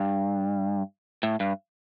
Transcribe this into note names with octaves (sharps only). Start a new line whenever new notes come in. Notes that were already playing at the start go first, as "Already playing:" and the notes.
Already playing: G2
A2
G2